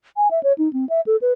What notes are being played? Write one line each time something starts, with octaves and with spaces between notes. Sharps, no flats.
G#5
E5
C#5
D#4
C4
E5
A4
B4